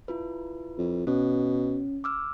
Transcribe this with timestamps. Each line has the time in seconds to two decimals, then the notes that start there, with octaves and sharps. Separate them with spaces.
0.08 E4 F4 B4
0.78 F2
1.07 B2 C#4
2.04 D6 E6 F6